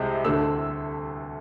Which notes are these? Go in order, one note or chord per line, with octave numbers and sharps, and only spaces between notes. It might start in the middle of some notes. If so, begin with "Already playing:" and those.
Already playing: C2 C3 G#3
D2 D3 A3 E6